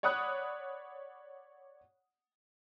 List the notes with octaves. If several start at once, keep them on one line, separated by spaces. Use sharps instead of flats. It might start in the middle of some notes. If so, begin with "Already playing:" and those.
C#5 D5 F#5 B5 D#6 F#6